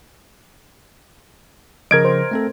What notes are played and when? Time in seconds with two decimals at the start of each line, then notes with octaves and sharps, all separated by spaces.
1.91 C#3 F3 A#4 D#5 G#6 D7
2.05 C5
2.31 A3 C4 A4